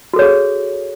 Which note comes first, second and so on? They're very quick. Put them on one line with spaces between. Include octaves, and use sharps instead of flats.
F#4 A4 C#5 G#4